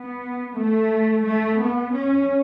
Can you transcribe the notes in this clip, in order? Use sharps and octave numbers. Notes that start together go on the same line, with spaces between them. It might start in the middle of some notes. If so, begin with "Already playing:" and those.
Already playing: B3
A3
A3
B3
C#4